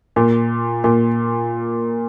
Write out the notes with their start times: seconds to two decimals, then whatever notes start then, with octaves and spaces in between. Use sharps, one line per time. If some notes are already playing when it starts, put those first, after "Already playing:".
0.16 A#2
0.84 A#2